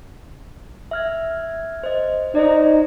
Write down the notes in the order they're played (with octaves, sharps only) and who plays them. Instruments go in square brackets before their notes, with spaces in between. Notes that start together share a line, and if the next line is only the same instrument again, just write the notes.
[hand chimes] E5 F6 G#6
C5 D#5
[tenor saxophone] D#4 [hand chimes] C5 D5